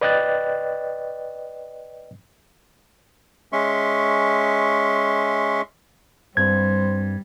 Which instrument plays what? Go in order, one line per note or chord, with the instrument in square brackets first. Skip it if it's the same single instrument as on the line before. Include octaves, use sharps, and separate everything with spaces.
[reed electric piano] B4 D5 D#5 G5 F#6 A6
[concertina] G#3 C#4 E5 C6 C#6
[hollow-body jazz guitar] G2 C4 [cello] G3 [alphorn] C5 [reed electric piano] G#6